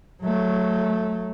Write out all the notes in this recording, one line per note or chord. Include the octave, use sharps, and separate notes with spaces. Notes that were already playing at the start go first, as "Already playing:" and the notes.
F#3 A3